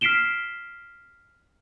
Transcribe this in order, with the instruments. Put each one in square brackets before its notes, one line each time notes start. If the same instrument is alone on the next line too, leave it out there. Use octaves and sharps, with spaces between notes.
[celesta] F6 B6 C7 D7 E7 G7